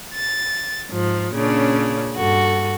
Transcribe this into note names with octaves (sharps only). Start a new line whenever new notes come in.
A6
G#2 F3
A#2 C#3 C#4 D4
G2 F#4 A4